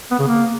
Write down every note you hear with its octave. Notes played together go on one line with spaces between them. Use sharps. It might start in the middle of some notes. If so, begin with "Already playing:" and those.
B3
C#3
A#3